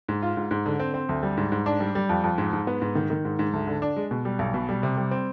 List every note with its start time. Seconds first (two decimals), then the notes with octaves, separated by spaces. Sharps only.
0.09 G#2
0.22 F4
0.37 G#2
0.51 G#2
0.66 D3
0.80 C4
0.94 C4
1.09 D2
1.23 G3
1.37 G#2
1.52 G#2
1.66 D4
1.80 G3
1.95 G3
2.09 F2
2.24 F2
2.38 G#2
2.53 G#2
2.67 B3
2.82 G#2
2.95 D#3
3.10 D#3
3.25 G#2
3.39 G#2
3.53 D2
3.67 D3
3.82 D4
3.96 G#3
4.11 B2
4.25 G3
4.39 B1
4.54 B2
4.69 G3
4.83 C3
4.97 G3
5.11 C4